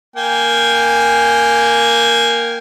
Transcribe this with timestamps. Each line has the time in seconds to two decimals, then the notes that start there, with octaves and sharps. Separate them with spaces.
0.16 A#3 G5 G#5